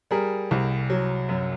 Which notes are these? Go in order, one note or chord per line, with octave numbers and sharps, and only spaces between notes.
G3 G#4 A#4
C2
F#3
F#2